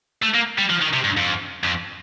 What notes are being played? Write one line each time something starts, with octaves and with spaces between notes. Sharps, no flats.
A3
A#3
G3
F3
D#3
C3
G2
F2
F2